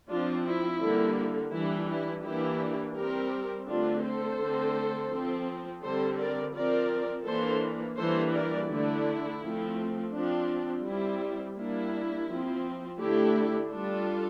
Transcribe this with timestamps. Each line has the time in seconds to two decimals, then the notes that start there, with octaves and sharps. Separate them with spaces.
0.09 F3 C4 D4 F4
0.45 E4
0.81 D3 G3 A#3
1.52 E3 G3 D4 E4
1.89 E4
2.24 E3 A#3 D4 E4 G4
2.96 G3 C4 G4 A#4
3.67 D3 A3 C4 D4 F4
4.03 A4 C5
4.39 D3 A3 C4
5.11 F3 C4
5.83 D3 G3 C4 A4 C5
6.18 A#4 D5
6.54 F3 C4 A#4 D5
7.26 E3 A#3 D4 A4 C5
7.97 E3 G3 A#3 D4 A4 C5
8.33 A#4 D5
8.69 D3 A3 D4 E4
9.41 F3 A3 C4
10.13 F3 C4 D4
10.84 G3 C4 E4
11.56 G3 A#3 D4 E4
12.28 F3 C4
12.99 D3 A3 D4 E4 G4
13.71 G3 D4 F4 A4